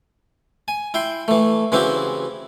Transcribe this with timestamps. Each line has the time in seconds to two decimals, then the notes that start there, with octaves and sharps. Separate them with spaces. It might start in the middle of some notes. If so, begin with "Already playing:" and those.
0.68 G#5
0.94 E4 G5 C6
1.28 E3 A3
1.72 C#3 E3 C4 E4 F#4 G4